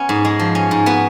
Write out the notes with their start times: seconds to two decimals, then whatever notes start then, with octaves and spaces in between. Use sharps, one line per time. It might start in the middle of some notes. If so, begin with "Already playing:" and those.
Already playing: B3 C#4
0.09 G#2
0.25 G#3
0.39 F3
0.55 C#4
0.71 G#2
0.86 B3 F#4